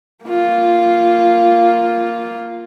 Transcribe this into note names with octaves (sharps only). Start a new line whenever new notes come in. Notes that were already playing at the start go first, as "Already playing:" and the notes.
A#3 F4